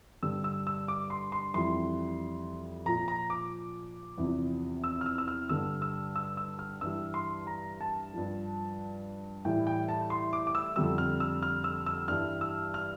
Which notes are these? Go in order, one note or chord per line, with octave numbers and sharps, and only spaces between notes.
G2 D3 G3 E6
E6
E6
D6
C6
C6
F2 E3 G3 C6
A#2 F3 A#5
A#5
D6
E2 C3 F3
E6
F6
E6
E6
F6
G2 D3 G3 E6
E6
E6
E6
F6
G2 E3 G3 E6
C6
A#5
A5
G2 F3
A2 E3 G3 G5
G5
A5
C6
D6
D6
E6
F2 D3 G3 E6
F6
E6
F6
E6
E6
G2 E3 G3 F6
E6
F6